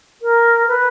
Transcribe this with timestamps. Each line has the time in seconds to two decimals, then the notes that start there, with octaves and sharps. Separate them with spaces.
0.22 A#4
0.68 B4